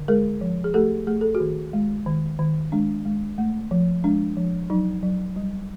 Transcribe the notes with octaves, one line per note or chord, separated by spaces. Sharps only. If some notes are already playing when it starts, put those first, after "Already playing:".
Already playing: D3
G#3 G#4 A#4
F3
G#4
A3 G4 A4
A3 G#4
A4
F#4 G#4
D#3
G#3
D#3
D#3
G#3 D4
G#3
A3
F3
G#3 D4
F3
F#3 D#4
F#3
G3